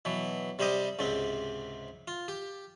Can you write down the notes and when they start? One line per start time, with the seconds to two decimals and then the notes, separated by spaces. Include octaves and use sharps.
0.05 B2 E3 F#3
0.59 C3 G3 G4 C5 D#5
0.99 C#2 G#2 C3 C4
2.08 F4
2.28 G4